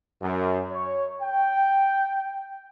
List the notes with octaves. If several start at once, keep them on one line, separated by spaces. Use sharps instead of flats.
F#2
C#5
G5